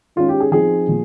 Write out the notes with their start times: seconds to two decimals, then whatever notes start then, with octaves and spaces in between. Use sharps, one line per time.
0.16 D#3 G#3 C#4 F4
0.29 G4
0.40 G#4
0.52 F3 C4 D#4 G#4
0.87 A#2 F3